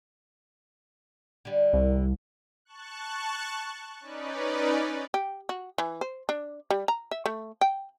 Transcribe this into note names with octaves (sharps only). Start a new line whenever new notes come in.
D3 G3
C2
A5 C#6 F#6
C#4 D#4 B4 D5
G4
F#4
E3
C5
D4
G3
A#5
E5
A3
G5